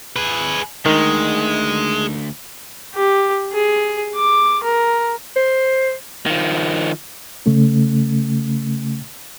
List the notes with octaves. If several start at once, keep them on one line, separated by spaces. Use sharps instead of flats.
G#4 B4
D2 D#3 G#3
G4
G#4
D6
A#4
C5
D#3 F3
C#3 A3 C#4